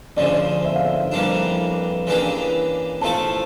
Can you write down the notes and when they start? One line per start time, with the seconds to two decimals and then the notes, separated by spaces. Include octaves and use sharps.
0.17 D2 C#3 F3 D5
0.65 E5
0.76 F5
0.86 E5
1.12 F2 E3 G3 A#3 D4
2.07 C#3 E3 A#3 D4 G4
3.01 A2 F3 A3 E4 A4 A5